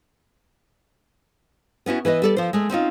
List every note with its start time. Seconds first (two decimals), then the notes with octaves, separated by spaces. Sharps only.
1.86 B3 C#4 E4 F#4
2.05 E3 B4 D5 D#5
2.22 G3 A4 D5
2.37 F3 C5
2.53 G#3 A3
2.70 C4 C#4 D#4 F4